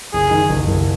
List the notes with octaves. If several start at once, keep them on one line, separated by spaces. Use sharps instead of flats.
F#1 G#4
D#3
F#1
F#1